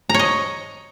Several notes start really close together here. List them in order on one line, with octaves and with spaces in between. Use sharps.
A#5 C#5 D#5